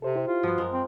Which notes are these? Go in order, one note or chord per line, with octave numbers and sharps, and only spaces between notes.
C3 A4 C5
E4 G4 C5
F4
G2 F3 B3 F#4
F#2 G#3 A#4
C4